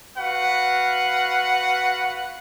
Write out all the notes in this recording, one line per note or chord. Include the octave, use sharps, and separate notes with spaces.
F#4 B4 F5 F#5